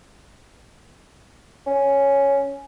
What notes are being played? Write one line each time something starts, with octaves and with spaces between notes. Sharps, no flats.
C#4